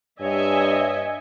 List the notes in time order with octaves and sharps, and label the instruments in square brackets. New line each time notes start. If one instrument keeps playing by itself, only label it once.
[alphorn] G2 [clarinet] C#5 [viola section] D#5 E5 G#5